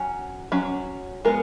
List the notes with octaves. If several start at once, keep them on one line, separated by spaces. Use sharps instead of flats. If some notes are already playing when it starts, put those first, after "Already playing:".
Already playing: F#3 C#4
F#3 C#4
G#3 B3 A#4